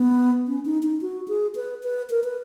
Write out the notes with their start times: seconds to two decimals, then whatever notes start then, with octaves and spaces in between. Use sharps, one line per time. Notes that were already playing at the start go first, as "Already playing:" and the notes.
Already playing: B3
0.48 C#4
0.65 D#4
0.83 D#4
1.01 F#4
1.28 G#4
1.56 B4
1.83 B4
2.10 A#4
2.24 B4